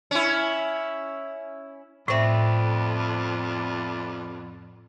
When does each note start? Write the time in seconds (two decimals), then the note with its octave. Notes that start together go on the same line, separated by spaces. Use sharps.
0.11 C#4 E4
2.08 F2 A2 A3 B3 C4 D5 E5